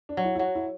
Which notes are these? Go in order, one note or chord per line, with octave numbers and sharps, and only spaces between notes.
D4
F#3
E4
E4
F#3 F#4
E4